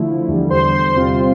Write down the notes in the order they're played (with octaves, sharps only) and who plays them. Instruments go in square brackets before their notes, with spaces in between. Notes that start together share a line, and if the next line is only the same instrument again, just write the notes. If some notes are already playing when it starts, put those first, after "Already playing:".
Already playing: [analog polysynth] D3 F3 A3 E4
E2 D3 G3
C5 C6
C5 C6
C3 G3 C4 F4